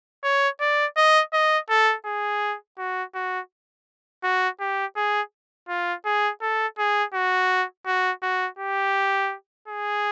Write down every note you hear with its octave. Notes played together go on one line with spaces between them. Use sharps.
C#5
D5
D#5
D#5
A4
G#4
F#4
F#4
F#4
G4
G#4
F4
G#4
A4
G#4
F#4
F#4
F#4
G4
G#4